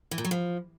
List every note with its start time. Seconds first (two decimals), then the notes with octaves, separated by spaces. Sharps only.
0.11 E3
0.18 A#2
0.25 F#3
0.31 F3